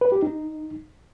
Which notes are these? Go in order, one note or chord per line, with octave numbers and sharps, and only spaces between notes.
B4
G4
D#4